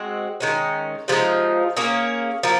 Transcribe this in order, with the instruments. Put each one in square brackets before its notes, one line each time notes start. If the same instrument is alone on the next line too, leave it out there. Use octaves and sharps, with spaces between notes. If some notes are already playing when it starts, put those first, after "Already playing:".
Already playing: [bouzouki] G#3 C4 F#4
D#3 G#3 C#4
C3 F3 G#3 D#4
A#3 C#4 G#4
F3 A#3